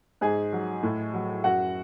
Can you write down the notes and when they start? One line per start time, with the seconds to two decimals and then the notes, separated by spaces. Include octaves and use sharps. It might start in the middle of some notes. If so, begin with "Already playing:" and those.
0.21 G#2 G#4 G#5
0.53 F#3
0.83 A2
1.14 F#3
1.44 F#2 F#4 F#5